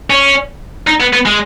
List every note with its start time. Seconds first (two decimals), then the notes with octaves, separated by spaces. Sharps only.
0.10 C#4
0.87 D#4
1.00 B3
1.13 B3
1.26 G#3